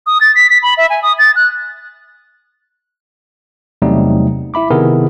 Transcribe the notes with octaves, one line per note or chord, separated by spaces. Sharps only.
D#6
A6
B6
B6
B5
E5
G#5
D#6
A6
F#6
E2 C3 F#3 G3 A3 D#4
E4 E5 B5 D6
C3 D#3 B3 E4 G#4 A#4